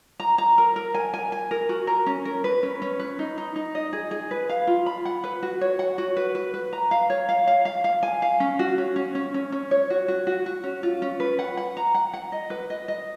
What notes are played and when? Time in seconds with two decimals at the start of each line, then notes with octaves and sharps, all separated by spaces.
0.20 A#5
0.38 A#5
0.58 A#4
0.76 A#4
0.94 G#5
1.14 G#5
1.32 G#5
1.51 A#4
1.69 F#4
1.87 A#4
2.06 C#4
2.25 A#4
2.44 B4
2.63 C#4
2.82 C#4
2.99 B4
3.19 D#4
3.38 D#4
3.56 D#4
3.75 D#5
3.93 G#4
4.11 G#4
4.31 B4
4.49 F5
4.67 F4
4.86 B5
5.05 F#5
5.24 B4
5.43 F#4
5.61 C#5
5.79 F#5
5.98 F#4
6.17 B4
6.35 B4
6.54 B4
6.73 A#5
6.91 F5
7.10 C#5
7.29 F5
7.47 F5
7.65 F5
7.84 F5
8.03 G#5
8.22 F5
8.40 C#4
8.59 F#4
8.78 C#4
8.96 C#4
9.15 C#4
9.34 C#4
9.52 C#4
9.71 C#5
9.90 F#4
10.08 F#4
10.27 F#4
10.46 F#4
10.64 C#4
10.83 F4
11.02 C#4
11.20 B4
11.39 F#5
11.57 F#5
11.77 A#5
11.95 F#5
12.14 F#5
12.32 D#5
12.50 B4
12.70 D#5
12.88 D#5